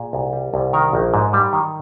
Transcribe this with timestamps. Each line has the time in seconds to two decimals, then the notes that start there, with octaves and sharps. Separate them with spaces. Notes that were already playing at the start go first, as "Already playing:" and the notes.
Already playing: A#2 G#4
0.13 C2
0.33 G3
0.54 C2
0.73 D#3 A#4
0.93 A#1
1.14 G#2
1.33 G3
1.53 D#3